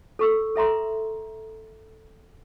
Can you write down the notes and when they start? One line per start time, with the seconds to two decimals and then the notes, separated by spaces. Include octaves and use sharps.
0.19 A4 C#6 E6
0.56 A4 E5 A#5 C6